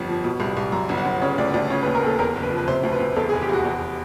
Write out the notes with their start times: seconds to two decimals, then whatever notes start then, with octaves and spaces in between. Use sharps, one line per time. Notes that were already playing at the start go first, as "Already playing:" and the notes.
Already playing: G1 F2
0.08 F3
0.24 B2
0.40 C2
0.57 C2
0.72 F#2 A#5
0.89 G1
0.97 F#5
1.05 G1
1.22 C#3 C#5
1.38 D2 D5
1.54 D2 D5
1.70 C#3 C#5
1.83 B4
1.86 D#2
1.95 A#4
2.03 D#2 A4
2.19 E2 A#4
2.35 F#1
2.43 B4
2.51 F3
2.58 B4
2.68 C3 C5
2.83 D2
2.92 B4
3.00 D2
3.16 E2 A4
3.29 G#4
3.33 F1
3.41 G4
3.49 F1 F#4
3.65 E2